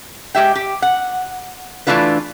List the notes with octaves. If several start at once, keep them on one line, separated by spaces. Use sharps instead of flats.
G#3 G4 E5 G5
G4
F#5
E3 F3 A3 D4 F4 B4